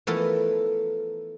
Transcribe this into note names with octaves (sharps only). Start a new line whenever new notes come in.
E3 F3 A3 B3 A4 A#4